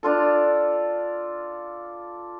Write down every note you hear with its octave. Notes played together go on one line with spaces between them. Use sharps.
D4 F4 A4